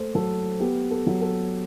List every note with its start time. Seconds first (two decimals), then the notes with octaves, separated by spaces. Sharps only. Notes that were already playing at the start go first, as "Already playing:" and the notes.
Already playing: A3 C5
0.15 F#3 A4
0.60 B3 G4
0.91 A4
1.07 F#3
1.22 A4